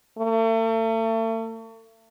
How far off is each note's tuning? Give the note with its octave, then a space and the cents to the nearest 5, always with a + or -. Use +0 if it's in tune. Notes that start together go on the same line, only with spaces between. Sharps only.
A3 +40